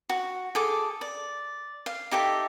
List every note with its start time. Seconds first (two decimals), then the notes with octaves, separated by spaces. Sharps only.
0.09 F#4
0.55 G#4 A4 D6
1.01 D5
1.86 F5
2.11 D#4 G4 A4 E5